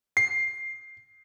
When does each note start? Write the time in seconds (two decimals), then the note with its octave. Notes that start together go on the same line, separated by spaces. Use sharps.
0.17 C7